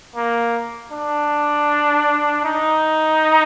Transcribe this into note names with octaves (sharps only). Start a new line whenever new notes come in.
A#3
D4
D#4